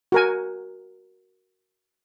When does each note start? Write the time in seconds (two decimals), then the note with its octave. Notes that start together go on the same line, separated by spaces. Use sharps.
0.12 F#4 A#4 G#5